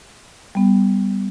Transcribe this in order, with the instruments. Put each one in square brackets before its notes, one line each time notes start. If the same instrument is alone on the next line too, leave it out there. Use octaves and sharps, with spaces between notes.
[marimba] G3 B3